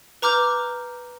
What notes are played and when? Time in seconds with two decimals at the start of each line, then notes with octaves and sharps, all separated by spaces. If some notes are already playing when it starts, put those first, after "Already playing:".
0.22 B4 A#5 D6 F6 G6